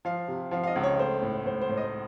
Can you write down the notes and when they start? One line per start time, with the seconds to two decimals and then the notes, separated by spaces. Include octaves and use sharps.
0.05 F3 F5
0.28 C3
0.51 F3 F5
0.64 F5
0.67 D#5
0.76 C#2
0.84 C#5
0.99 A3 C5
1.22 A2
1.46 A2 C5
1.61 C5
1.69 A2
1.77 D#5